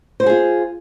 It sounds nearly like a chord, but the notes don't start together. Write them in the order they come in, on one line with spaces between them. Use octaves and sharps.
C5 F#4 G#4 F4